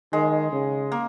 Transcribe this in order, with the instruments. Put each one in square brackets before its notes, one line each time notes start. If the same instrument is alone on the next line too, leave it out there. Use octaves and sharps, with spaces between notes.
[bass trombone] D#3 [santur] G#3
[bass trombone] C#3
[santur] A#3